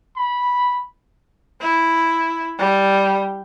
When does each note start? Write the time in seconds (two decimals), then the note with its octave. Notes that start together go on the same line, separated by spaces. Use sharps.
0.17 B5
1.61 E4
2.59 G3